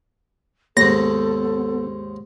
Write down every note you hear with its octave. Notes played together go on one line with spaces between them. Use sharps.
D#2 G#2 B3 A4 A#6